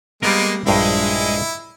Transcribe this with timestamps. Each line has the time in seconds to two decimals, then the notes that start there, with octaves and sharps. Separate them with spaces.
0.23 G3 G#3 A#3 B3 A#4
0.67 A#1 G2 G#3 E4 G5